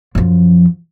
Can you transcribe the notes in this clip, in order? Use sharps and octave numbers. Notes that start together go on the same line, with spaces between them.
F#2 F3